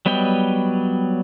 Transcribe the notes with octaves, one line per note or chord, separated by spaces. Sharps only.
F#3 G3 B3 D#5 G5